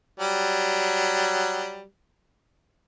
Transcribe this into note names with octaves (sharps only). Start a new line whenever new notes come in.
F#3 G3